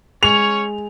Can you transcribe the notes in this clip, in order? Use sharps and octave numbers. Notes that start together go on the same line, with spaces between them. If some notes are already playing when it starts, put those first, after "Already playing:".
G#3 C#4 C#5 F7